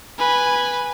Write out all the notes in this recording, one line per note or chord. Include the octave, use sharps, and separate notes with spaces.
B4 G#5